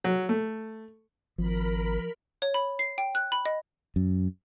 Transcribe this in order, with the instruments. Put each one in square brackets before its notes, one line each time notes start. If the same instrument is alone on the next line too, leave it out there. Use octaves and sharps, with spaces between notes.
[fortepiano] F#3
A3
[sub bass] G#1 [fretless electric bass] F3 [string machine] A#4 B5
[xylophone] C#5
B5
C7
G5
F#6
B5
D#5
[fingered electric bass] F#2